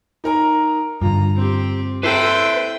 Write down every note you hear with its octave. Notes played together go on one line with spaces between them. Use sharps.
D#4 A#4 A#5
G2 D3 F4 A#5
C4 G4
E4 A4 B4 C5 E5 G5